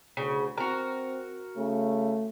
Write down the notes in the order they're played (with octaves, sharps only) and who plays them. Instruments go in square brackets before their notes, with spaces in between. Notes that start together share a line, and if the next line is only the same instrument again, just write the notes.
[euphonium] D2 [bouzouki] C#3
[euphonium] C4 [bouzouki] F#4 A#4
[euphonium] C#3 [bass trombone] A3